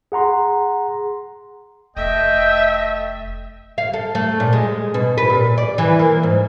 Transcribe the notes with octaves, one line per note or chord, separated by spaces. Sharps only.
G#4 F#5 A#5 C6
F1 A3 D#5 E5 G5
F5
A4
A3
A#2
G#3
B2
B4
A#2
D5
E3
A#3
G#2